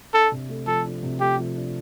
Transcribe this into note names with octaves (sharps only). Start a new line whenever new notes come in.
D4 A4
C3
A3
F3 A4
D4
C3
A3 G4
F3
D4